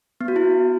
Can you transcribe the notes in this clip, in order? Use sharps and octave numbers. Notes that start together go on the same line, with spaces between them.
B3
F#4
E4